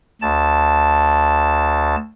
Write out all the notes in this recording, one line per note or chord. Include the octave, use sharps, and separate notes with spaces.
D2 A5